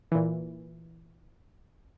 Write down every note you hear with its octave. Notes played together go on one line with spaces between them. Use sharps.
A#2 E3